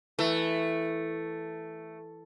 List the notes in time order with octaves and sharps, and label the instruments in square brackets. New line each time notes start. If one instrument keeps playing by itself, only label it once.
[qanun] E3 [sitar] A3